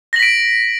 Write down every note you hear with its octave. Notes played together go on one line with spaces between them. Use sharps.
A#6 B6 D7 F#7